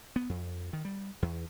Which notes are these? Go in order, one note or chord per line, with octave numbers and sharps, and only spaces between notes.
B3
F2
D#3
G3
E2